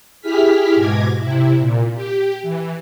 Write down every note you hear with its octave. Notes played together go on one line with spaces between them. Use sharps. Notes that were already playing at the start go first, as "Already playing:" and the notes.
E4 G4 G#4 F6 B6
G#2 B2 D6 G#6 A#6
C3 E4
A#2
G4
E3